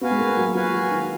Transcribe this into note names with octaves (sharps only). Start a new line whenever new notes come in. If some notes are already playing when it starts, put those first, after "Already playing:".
B3 F#4 B4 F5 G#5
G#3
A#3
F#3
F3 F#4 B4 F5 G#5
F3
D#3